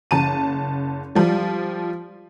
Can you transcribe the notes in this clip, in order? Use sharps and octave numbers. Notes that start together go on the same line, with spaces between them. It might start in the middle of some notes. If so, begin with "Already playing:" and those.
F#1 A5 D#7
F3 G3